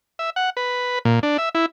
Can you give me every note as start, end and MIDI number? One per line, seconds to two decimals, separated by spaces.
0.19 0.30 76
0.36 0.50 78
0.57 0.99 71
1.05 1.20 46
1.23 1.37 62
1.38 1.49 76
1.55 1.66 64